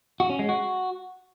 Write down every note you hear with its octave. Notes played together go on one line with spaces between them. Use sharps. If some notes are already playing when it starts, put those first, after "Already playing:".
F#4
C#4
G#3
F#4